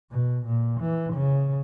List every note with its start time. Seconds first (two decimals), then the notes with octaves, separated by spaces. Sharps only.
0.11 B2
0.46 A#2
0.80 E3
1.13 C#3